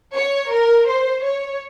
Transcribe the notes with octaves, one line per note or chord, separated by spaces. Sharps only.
C#5
A#4
C5
C#5